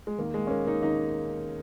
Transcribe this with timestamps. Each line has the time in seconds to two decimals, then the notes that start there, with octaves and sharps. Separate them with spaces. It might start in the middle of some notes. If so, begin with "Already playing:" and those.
0.07 G#3
0.18 D#2 D#3 A#3
0.34 G#3
0.47 C#4
0.50 A#3
0.66 A#3 D#4
0.82 D#2 D#3 A#3 D#4